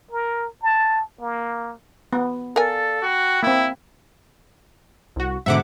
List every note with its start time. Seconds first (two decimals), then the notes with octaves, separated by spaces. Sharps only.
0.11 A#4
0.63 A5
1.20 A#3
2.13 B3
2.56 A4 A#4 D5 F5 G#5
3.03 F#4 G5 B5
3.43 A#3 C4 E4
5.16 C2 F#4
5.46 G#2 B2 D3 E5 F#5 D6